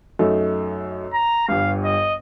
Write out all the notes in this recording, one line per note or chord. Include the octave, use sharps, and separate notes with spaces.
F#2 A3 D#4
A#5
G1 G2 F5
D#5